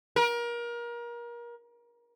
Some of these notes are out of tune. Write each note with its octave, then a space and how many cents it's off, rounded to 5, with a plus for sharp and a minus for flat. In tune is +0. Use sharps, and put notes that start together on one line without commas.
A#4 +30